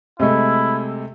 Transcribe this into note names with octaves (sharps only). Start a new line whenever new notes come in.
C3 G#3 A3 E4